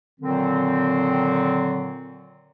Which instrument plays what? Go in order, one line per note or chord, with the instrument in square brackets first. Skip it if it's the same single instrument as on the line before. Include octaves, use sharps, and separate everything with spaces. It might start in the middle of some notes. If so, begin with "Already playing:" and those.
[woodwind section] A#2 D3 D#3 F#3 C4